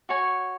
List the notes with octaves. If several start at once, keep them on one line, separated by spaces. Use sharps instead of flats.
F#4 C#5 G#5